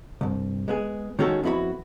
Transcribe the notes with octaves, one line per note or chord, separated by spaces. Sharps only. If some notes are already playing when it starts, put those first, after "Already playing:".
C2 G2
G#3 B3 G#4
D#3 G#3 C#4 F#4 G#4 A4
F2 B3 E4 F#4 B5